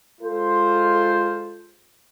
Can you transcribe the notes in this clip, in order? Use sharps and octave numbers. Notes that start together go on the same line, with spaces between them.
G#3 F4 A4 C5